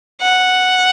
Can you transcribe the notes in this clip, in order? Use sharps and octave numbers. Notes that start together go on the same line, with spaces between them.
F#5